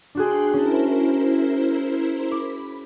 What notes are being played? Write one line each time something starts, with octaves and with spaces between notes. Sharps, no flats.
D4 F#4 G#4 G5 C6 F#6
C#4 E4 A#4 C5 A5
B5 D6